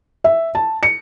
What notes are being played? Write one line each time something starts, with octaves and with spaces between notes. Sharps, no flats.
E5
A5
C#7